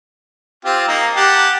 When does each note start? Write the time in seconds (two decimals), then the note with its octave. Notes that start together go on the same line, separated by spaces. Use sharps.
0.65 C4 F4 G4
0.88 A#3 D#4
1.16 G4 F#5 A5